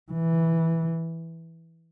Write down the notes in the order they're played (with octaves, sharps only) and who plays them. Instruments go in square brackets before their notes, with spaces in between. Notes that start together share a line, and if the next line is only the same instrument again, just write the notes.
[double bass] E3